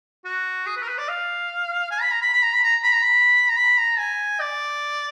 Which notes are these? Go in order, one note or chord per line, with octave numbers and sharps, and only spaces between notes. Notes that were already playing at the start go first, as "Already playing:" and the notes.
F#4
G#4
B4
A#4
B4
D5
F5
G#5
B5
A#5
B5
B5
A#5
B5
A#5
B5
A#5
B5
A#5
B5
A#5
G#5
D5